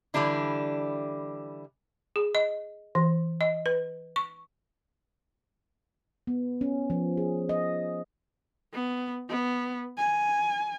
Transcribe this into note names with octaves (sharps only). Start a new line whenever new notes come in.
D3 E3 G3 D4 E4
G#4
D#5
E3
D#5
B4
C#6
B3
C#4
F3
G#4
D#5
B3
B3
G#5